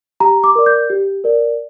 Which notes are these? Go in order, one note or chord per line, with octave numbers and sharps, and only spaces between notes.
G4 A#5
D6
A#4 D5
G6
G4
A#4 D5